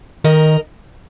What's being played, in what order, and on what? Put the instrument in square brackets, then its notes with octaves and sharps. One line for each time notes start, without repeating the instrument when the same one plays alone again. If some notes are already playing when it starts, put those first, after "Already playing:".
[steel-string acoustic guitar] D#3 A#4 D#5